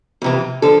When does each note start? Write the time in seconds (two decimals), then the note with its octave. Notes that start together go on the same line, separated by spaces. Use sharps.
0.22 F2 C3 E3
0.62 D3 F3 A4